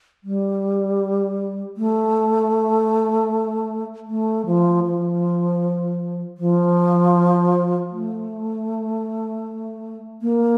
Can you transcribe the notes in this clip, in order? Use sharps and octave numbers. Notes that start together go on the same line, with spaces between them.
G3
A3
A3
F3
F3
F3
A3
A#3